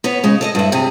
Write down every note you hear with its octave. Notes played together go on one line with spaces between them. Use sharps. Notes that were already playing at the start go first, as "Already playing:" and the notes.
B3 B4 C#5
C#3 G#3
A4 D5 D#5
G2 E4
C3 G#4